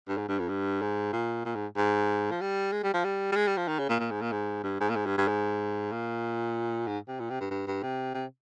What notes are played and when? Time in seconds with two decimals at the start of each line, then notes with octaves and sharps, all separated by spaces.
0.08 G2
0.17 G#2
0.28 G2
0.39 F2
0.49 G2
0.81 G#2
1.13 A#2
1.45 A#2
1.55 G#2
1.77 G#2
2.31 F3
2.41 G3
2.72 G#3
2.84 G3
2.93 F3
3.04 G3
3.32 G3
3.36 G#3
3.47 G3
3.57 F3
3.68 D#3
3.79 C#3
3.89 A#2
3.99 A#2
4.11 G#2
4.22 A#2
4.32 G#2
4.63 G2
4.80 G#2
4.90 A#2
4.96 G#2
5.06 G2
5.18 G2
5.28 G#2
5.92 A#2
6.87 G#2
7.08 C3
7.20 A#2
7.30 C3
7.40 G2
7.51 G2
7.67 G2
7.83 C3
8.14 C3